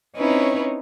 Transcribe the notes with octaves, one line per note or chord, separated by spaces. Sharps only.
C4 C#4 D#4 E4 B4 C#5